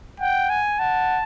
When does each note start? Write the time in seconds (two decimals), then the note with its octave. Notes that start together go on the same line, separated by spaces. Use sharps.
0.20 F#5 G5
0.50 G#5
0.79 F#5 A5